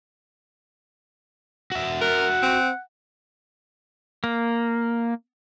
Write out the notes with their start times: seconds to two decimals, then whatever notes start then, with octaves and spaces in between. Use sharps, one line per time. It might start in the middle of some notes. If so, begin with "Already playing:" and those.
1.72 F#4 E5
2.02 A#4 F#5
2.43 C4
4.24 A#3